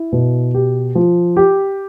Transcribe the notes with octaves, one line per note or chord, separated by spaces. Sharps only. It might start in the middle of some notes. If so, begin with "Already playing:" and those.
Already playing: E4
B2
G4
F3
G4